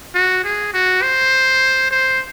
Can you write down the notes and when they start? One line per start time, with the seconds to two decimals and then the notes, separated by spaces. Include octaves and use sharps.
0.15 F#4
0.44 G#4
0.74 F#4
1.03 C5
1.91 C5